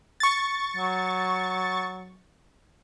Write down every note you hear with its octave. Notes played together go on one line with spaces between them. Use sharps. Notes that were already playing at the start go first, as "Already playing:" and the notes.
C#6 A6
F#3